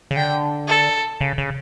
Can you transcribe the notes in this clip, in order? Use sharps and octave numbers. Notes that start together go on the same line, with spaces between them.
C#3
D3 G5
A4
C#3
C#3